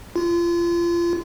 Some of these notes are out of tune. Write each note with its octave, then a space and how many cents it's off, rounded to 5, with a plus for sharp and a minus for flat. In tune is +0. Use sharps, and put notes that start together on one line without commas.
F4 -30